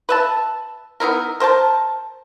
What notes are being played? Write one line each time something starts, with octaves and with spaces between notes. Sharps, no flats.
B4 E5 A5
B3 D#4 E4 A#4
A#4 C5 G5 A5